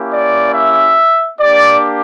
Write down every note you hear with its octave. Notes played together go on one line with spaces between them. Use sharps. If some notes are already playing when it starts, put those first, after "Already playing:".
Already playing: A#3 C#4 E4 G4
D5
E5
A#3 D4 G4 D5